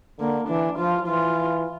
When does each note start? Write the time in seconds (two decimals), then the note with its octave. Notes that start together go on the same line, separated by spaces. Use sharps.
0.20 D3 A#3
0.49 E3 D4
0.78 F3 F4
1.06 E3 F4